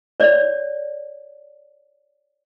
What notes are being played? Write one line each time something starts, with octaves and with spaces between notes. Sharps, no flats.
C#5 D5